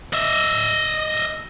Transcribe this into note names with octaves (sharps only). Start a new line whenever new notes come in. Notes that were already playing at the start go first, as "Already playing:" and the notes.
D#5 E5